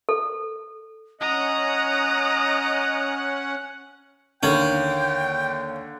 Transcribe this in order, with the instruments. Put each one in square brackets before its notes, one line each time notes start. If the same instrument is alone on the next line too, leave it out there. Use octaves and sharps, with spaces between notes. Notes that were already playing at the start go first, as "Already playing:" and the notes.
[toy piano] A4
[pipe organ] C#4 F#5 [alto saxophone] D#5 [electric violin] A#5 D#6 [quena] F#6
[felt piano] D#2 A#3 [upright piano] D3 G#6 F#7 [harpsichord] C#4 [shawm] G5